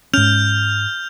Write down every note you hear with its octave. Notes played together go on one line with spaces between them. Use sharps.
G#2 C#4 F6 G6 F7